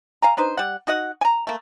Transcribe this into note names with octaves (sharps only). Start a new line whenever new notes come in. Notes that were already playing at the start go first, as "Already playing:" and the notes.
F5 G#5 A#5
D4 D#4 B4 C5
G3 F#5
D#4 F#4 D#5 F#5
G#5 A#5
A3 A#3